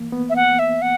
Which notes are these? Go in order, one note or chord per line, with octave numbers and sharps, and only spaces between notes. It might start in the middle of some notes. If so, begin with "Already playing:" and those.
Already playing: E3 A#3
B3
E5
F#5
E5
F#5